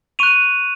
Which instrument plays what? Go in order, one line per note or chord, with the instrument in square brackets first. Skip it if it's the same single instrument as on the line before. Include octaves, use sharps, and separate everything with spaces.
[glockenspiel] C#6 F#6 D#7 F7